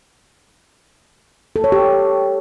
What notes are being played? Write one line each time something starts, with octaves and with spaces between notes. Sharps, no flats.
A4
C#5
G4